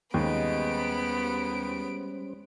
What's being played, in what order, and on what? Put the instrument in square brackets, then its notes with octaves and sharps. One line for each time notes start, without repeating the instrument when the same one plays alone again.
[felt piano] D#2 [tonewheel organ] G3 C#4 C5 [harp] G#3 [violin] B3 D7